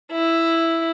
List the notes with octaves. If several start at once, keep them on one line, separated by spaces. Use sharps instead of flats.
E4